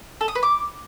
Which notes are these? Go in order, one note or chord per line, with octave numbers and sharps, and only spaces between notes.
A4
D#6
B4
D6